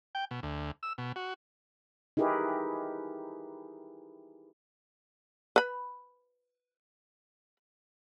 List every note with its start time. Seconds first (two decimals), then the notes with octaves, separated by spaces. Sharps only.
0.15 G5
0.31 B2
0.43 D2
0.83 E6
0.98 B2
1.16 F#4
2.17 D#4 E4 G4 G#4 A#4 B4
5.56 B4 B5